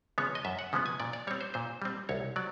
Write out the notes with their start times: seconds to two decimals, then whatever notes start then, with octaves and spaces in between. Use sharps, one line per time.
0.18 C#3 F3 G#3 B3 C#5
0.35 D#5
0.45 F#2 E5
0.59 F#5
0.73 C#3 F3 G#3 B3
0.86 G#5
1.00 A#2 D5
1.13 D5
1.27 G3 C4 C#5
1.41 C5
1.54 A#2 C5
1.82 G3 C4
2.09 C2 C#5
2.36 F#3 D5